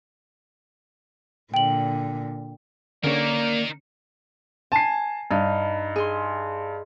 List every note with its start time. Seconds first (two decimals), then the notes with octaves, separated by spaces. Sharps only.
1.54 A#2 D3 G5 F#7
3.04 D3 A#3 C#4 D#4 A#4 C#5 D5
4.72 G#5 A5 C7
5.31 G2 D#4
5.96 G#4 C6